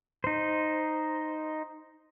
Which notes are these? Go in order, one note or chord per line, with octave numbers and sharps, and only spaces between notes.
D#4 C5